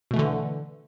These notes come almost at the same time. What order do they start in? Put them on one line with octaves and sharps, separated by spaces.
B2 A3 E3 D3